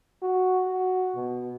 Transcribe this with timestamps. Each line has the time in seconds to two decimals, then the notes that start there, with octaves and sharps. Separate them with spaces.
0.22 F#4
0.67 F#4
1.15 B2